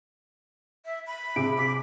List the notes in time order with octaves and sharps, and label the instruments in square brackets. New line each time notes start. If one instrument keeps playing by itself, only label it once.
[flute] E5
B5
[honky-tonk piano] C3 G#4 D7
[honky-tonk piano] D6 [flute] B6